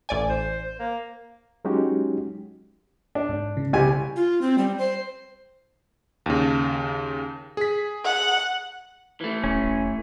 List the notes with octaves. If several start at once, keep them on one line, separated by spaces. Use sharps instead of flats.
A1 D5 G#5
C5
C5
A#3
F#3 G#3 C#4 D#4 F#4 G4
D4
G#2
C#3
C2 G4 G#5
F4
C4
G3
C5
D#2 C#3
G#4 B6
F#5
E3 A3
D#1 C#4
E1